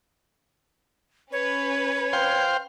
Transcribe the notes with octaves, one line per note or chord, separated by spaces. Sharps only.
C#4 B4 C#5
C5 F5 G5